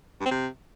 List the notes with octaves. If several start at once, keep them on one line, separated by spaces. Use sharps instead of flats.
G2
C4
C3